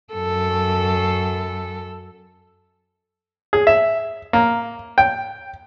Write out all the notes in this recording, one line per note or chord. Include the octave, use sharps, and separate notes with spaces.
F#2 A4
G#4
E5
A#3
G5